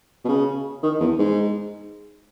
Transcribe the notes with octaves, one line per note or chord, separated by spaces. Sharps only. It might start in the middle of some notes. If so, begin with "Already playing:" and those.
B2
C#3
D#3
E2
G#2